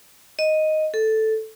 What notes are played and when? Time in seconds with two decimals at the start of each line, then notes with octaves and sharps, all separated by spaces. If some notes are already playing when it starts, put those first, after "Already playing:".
0.39 D#5
0.94 A4